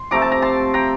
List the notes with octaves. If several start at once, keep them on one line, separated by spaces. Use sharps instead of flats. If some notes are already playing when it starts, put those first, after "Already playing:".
Already playing: C6
C3 F3 A3 C4 A#5 D6
A5
A#5
A5 C6
G5 A#5